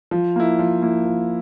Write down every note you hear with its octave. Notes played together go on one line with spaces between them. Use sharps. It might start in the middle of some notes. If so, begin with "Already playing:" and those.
F3
A#3 E4
F3
A#3 E4
F3